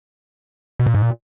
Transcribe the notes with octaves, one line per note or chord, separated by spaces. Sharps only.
B2
A#2
G#2
A#2